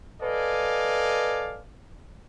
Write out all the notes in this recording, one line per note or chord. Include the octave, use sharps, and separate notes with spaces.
A4 B4 D5 D#5 F5 G#5